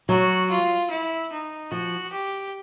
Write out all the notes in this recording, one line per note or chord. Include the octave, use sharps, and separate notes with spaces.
F#3 F#4
F4
E4
D#4
F3 F#4
G4